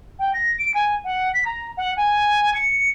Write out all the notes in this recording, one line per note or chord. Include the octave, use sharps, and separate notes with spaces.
G5
A#6
D7
G#5
F#5
B6
A#5
F#5
G#5
C#7